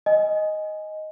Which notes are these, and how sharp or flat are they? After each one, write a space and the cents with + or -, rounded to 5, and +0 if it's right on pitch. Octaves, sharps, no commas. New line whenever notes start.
D#5 +0 G#5 +0